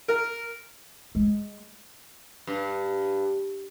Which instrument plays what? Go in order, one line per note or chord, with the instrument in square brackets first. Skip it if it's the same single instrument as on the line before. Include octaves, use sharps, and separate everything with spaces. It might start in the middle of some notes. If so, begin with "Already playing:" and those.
[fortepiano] A#4
[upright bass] G#3
[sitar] G2